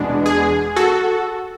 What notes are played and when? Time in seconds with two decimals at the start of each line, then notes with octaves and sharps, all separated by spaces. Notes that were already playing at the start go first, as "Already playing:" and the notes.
Already playing: E2 B2 G#3 B3 D4
0.26 G#4
0.76 F#4 A4